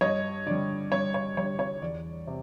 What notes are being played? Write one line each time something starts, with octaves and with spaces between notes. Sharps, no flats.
G2 C#5 D#5
D3 G3 D5
G2 C#5
C#5
D3 G3 C#5
C#5
E2 D5
C3